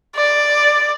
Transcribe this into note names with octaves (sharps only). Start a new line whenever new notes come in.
D5